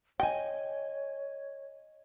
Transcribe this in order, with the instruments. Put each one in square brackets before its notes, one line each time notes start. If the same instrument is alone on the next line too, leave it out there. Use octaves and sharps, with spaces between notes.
[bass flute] C#5 [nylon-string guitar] D#5 G#5 [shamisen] G5